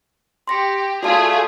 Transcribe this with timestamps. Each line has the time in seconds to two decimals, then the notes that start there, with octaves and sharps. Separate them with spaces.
0.48 G4 C6 A#6 C#7
1.03 A3 F4 F#4 G#4 D5 A5